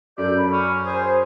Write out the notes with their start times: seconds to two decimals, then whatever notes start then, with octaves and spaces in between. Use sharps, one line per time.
0.18 F#2 A4 D5 G6
0.36 B5
0.52 C#4
0.84 G#4 C5